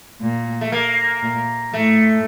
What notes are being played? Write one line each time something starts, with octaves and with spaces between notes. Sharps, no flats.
A#2
A3
A#3
A#2
A2 A3